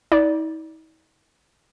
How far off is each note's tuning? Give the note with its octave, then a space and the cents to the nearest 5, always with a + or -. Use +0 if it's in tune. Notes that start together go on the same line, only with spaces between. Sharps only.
D#4 +45 D5 -10